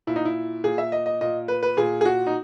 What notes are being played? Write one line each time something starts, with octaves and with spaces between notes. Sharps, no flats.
A#2 E4
D#4
E4
A#2 G#4
E5
D#5
D#5
A#2 D#5
B4
B4
A#2 G#4
G#4
F#4
D#4